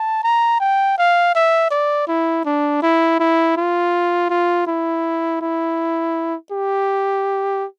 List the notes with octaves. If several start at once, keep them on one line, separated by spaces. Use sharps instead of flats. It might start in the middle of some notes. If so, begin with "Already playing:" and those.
Already playing: A5
A#5
G5
F5
E5
D5
E4
D4
E4
E4
F4
F4
E4
E4
G4